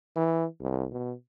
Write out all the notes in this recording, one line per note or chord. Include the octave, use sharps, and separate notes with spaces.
E3
C2
B2